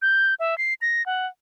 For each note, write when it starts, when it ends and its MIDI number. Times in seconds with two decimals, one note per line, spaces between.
0.02 0.34 91
0.40 0.57 76
0.58 0.74 96
0.82 1.05 94
1.06 1.27 78